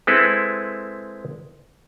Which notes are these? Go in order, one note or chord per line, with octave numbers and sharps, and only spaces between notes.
G#3 C4 E4 A4 B4